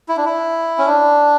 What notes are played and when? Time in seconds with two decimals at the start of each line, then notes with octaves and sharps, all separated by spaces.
0.09 E4
0.17 D4
0.25 E4
0.78 C#4
0.86 D4